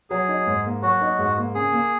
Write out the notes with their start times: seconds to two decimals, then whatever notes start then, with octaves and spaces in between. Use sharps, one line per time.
0.10 F#3 G#4
0.28 D#4
0.47 G#2
0.65 A#3
0.82 F#3 F#4
1.01 D#4
1.19 G#2
1.37 A#3
1.55 C#3 G#4
1.73 A#3